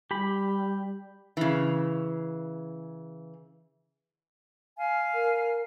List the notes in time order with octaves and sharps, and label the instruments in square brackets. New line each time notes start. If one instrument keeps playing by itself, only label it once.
[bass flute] G3 [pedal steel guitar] G4 B5
[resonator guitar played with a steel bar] C#3 E3
[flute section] F5 G#5
[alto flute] A#4